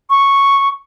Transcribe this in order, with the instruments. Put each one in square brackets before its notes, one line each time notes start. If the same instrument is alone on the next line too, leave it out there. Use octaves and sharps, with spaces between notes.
[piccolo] C#6